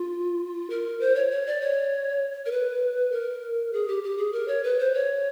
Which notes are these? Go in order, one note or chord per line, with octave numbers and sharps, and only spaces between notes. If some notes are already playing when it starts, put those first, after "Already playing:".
Already playing: F4
A#4
C5
C#5
C#5
D5
C#5
A#4
B4
A#4
G#4
G4
G4
G#4
A#4
C#5
B4
C5
C#5